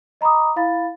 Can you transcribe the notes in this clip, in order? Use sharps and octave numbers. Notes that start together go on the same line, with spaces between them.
D#5 A#5 B5 D6 D#6
E4 F5 B5 A6